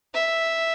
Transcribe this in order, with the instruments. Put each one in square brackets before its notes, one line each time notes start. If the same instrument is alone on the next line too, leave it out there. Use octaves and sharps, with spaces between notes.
[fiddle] E5